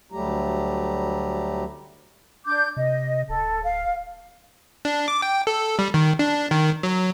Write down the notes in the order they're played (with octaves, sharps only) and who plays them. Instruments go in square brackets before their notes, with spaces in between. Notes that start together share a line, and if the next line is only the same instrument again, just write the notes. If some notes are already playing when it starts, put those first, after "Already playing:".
[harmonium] D2 F#3 G3 A3 G4 A#5
[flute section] D4 D6 G6
[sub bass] C3 [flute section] D#5
[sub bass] D1 [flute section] A4
[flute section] F5
[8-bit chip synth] D4
D6
G5
A4
G3
D#3
D4
D#3
F#3